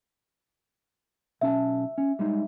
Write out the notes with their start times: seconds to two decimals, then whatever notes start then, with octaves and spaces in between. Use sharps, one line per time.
1.41 B1 C#4 E5 A5
1.98 C#4
2.19 G3 G#3 D#4